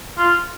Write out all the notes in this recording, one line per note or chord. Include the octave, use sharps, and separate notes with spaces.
F4